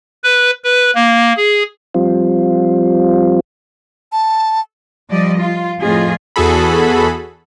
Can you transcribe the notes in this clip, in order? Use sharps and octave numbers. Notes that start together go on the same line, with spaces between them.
B4
B4
A#3
G#4
F3 G3 C4 F4
A5
F3 G3 D5 D#5
F4
F2 A2 F4 G#4 D#5
E2 F#4 G#4 A4 B5